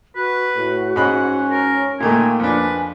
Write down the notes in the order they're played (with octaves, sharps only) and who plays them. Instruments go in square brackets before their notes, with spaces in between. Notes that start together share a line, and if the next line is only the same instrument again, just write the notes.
[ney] F#4 [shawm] B4
[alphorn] A2
[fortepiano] G#2 G#3 B5 [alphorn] C#4 [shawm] F#5
[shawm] A#4
[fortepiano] A#2 D#3 A3 [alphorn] A#3 [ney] G5 [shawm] G#5
[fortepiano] F2 D4 [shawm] B4 [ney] G#5